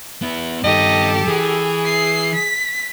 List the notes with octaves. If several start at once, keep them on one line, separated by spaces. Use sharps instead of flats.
B3 E4
G2 D#3 G4 A4 D#5
E3 G#4
C7
B6